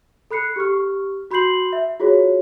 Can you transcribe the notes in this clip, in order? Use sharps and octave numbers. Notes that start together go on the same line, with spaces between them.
A4 B5 F#6 C7 C#7
G4 C#6 F6
F#4 B5 C6 G6 C7 F#7
E5
F4 F#4 G#4 C#5